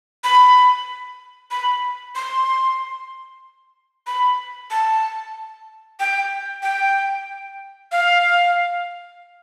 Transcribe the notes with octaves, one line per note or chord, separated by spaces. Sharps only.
B5
B5
C6
B5
A5
G5
G5
F5